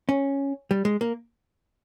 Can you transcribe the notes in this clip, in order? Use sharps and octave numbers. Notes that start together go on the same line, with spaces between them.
C#4
G3
G#3
A#3